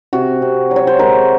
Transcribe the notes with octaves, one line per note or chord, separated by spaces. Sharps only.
C3 F#4
C3
F#3
C#5
C5
G#3 A#4